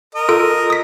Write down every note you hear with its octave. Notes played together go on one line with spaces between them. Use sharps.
A#4 D#5
F4 A4 D7
D#6 B6